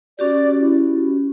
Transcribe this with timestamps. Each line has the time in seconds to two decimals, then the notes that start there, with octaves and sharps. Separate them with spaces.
0.19 C#4 F#4 G4 D5
0.60 E4